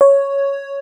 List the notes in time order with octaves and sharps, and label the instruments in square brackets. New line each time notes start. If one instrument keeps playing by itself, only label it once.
[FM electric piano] C#5